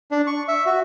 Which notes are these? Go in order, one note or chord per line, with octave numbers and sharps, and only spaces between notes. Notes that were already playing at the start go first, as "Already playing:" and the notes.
D4
C#6
E5
F#4